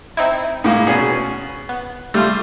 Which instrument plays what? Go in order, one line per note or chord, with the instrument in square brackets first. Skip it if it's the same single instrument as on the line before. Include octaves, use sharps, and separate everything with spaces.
[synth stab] C4 D#4 E4
[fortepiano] A2 G#3 A#3 [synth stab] B3
[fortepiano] B2 C#4 G#4 [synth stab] B3
[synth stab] B3
[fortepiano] G3 [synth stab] A3 F4